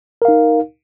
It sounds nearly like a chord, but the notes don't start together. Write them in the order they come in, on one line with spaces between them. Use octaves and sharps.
A#4 F5 D#4